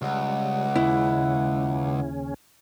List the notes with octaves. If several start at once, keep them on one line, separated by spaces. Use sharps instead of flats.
C#2 G3 F#5
D#2 C#3 C#4 E4